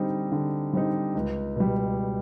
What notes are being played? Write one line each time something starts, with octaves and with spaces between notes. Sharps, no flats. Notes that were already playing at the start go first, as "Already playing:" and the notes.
Already playing: D3 G3 C4 D#4
D3
G3 C4 D#4
C#2
B2 G3